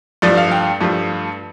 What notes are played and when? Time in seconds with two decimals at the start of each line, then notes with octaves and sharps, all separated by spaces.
0.22 G2 F3 A3 D5
0.37 F5
0.52 G5
0.81 G2 F3 A3